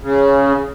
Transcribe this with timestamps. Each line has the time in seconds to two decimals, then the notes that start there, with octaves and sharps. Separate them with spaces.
0.02 C#3